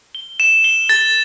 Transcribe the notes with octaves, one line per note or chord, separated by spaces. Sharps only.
G7
E7
G7
A6